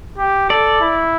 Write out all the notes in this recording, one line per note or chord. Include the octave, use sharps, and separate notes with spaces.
G4
A4 D5
E4